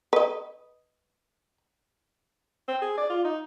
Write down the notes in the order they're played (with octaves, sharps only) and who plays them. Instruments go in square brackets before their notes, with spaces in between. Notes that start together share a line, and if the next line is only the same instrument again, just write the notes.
[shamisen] B4 D#5
[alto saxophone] C4
G#4
D5
F4
D#4